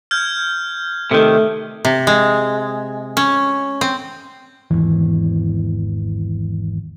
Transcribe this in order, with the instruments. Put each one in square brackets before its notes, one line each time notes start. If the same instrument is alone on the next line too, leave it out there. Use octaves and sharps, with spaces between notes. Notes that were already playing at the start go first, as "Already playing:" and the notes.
[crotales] F6 G6 G#6
[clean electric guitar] C3 D#3 [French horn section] A3 A4
[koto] C3
G#3
C#4
C4
[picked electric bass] G#1 E2 E3